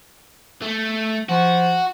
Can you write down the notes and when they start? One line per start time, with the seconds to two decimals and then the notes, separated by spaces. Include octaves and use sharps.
0.62 A3
1.29 F3 F#4